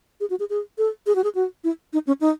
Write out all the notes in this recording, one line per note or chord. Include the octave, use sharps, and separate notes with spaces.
G#4
F#4
G#4
G#4
A4
G#4
F#4
G#4
F#4
E4
D#4
C#4
D#4